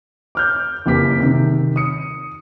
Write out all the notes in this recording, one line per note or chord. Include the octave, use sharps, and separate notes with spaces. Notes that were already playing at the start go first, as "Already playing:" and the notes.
D6 F6 G6
F#1 E3 A#3 G4 D6 B6
C3 D#3
D#6 C#7